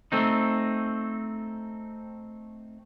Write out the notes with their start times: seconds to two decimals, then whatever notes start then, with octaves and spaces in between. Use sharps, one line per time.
0.12 A3 C4 D#4